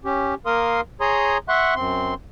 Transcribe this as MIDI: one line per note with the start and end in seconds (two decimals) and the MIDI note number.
0.05 0.34 61
0.05 0.34 67
0.46 0.81 58
0.46 0.81 70
0.46 0.81 77
0.46 0.81 84
0.46 0.81 87
1.01 1.38 68
1.01 1.38 73
1.01 1.38 82
1.01 1.38 84
1.01 1.38 87
1.49 1.74 76
1.49 1.74 78
1.49 1.74 84
1.49 1.74 85
1.49 1.74 90
1.76 2.14 42
1.76 2.14 60
1.76 2.14 84